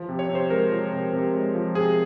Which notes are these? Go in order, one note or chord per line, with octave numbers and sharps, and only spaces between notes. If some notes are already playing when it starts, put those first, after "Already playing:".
Already playing: F3
C3
C#5
C3
C5
G#3 A#4
F3
C3
C3
G#3
F3
C3 G#4